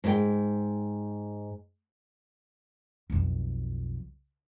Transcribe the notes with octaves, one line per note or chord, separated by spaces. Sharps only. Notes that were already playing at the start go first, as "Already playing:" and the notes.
G#2 A#4 G5
B1 F2